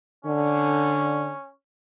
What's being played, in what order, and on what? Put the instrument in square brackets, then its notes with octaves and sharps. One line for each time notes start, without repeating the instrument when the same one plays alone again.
[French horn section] D3 [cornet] C#4